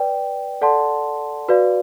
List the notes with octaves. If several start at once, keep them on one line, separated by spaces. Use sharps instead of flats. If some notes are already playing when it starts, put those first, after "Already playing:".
Already playing: B4 D5 G5
A4 D5 F#5 A5 C6
F#4 B4 D5 F5